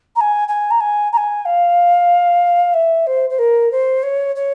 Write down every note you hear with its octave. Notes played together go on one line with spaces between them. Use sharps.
A#5
G#5
G#5
A#5
G#5
A#5
G#5
F5
E5
C5
C5
A#4
C5
C#5
C#5